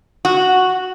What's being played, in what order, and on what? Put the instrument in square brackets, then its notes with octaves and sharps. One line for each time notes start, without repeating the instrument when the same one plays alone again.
[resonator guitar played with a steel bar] F#4